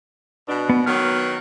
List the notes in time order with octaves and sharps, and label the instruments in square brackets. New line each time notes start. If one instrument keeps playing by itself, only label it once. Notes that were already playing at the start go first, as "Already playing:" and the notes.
[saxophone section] B2 D4
[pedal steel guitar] B3
[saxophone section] D#3 F#3 B3 [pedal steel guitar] F6